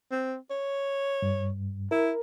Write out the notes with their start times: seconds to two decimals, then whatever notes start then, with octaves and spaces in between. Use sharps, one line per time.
0.11 C4
0.50 C#5
1.22 G2
1.91 E4 A#4